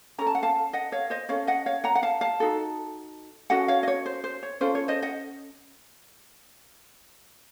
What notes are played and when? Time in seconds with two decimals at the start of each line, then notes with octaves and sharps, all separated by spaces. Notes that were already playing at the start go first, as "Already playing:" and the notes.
0.18 C#4 A4 A#5
0.27 A5
0.35 F#5
0.43 F5 A5
0.73 D#5 F#5
0.92 C#5 F5
1.10 C5 D#5
1.29 C#4 A4 C#5 F5
1.47 D#5 F#5
1.66 C#5 F5
1.84 F#5 A#5
1.95 F#5
2.03 F5 A5
2.21 F5 A5
2.40 D#4 F#4 A4
3.50 C#4 F#4 A4 D#5 F#5
3.68 C#5 F5
3.83 D#5
3.88 C#5
4.06 C5
4.24 C5
4.43 C#5
4.61 C#4 F4 A4 C5
4.75 C#5
4.88 C5 D#5
5.02 D#5 F#5